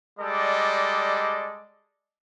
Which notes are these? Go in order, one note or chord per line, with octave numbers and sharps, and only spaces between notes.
G3 G#3 A4 D5 D#5